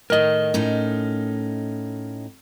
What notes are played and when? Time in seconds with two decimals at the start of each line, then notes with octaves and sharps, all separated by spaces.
0.10 A2 D#3 A#4 D#5
0.54 A2 C#4 D#4